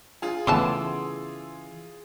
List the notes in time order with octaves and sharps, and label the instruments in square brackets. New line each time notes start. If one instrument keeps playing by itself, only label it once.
[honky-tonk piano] F4 G#4
[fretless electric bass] C#3 E3 [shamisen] A3 B3 A5 [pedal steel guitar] C6 D6 E6